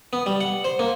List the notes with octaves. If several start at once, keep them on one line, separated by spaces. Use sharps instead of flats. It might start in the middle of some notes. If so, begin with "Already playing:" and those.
B3
G3
F#5
C5
A#3